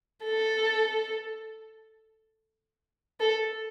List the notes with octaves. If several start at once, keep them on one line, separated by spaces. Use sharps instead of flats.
A4
A4